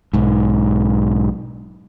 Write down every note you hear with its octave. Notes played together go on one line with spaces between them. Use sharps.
B1 G#2